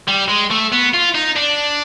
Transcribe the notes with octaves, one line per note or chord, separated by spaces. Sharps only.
G3
G#3
A3
B3
F4
D#4
D4